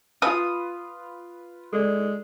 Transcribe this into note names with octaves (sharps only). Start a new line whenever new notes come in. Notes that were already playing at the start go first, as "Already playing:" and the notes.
F4 B4 D#6
G#3 A4 D5